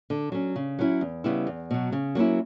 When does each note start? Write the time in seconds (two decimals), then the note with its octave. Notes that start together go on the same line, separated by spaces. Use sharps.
0.10 D3
0.32 F#3 C#4
0.56 C#3
0.79 F#3 C#4 E4
1.01 E2
1.24 C#3 G3 B3 E4
1.47 E2
1.71 B2 F#3
1.92 C#3
2.15 F#3 A#3 C#4 E4